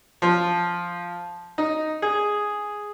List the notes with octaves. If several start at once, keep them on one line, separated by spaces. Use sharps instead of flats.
F3
D#4
G#4